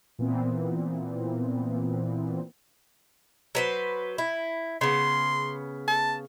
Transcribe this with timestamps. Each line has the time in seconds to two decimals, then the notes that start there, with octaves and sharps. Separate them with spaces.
0.19 A#2 E3 B3 C4
3.55 F#3 B4 C5
4.18 E4
4.81 C#3 B3 C6
5.88 A5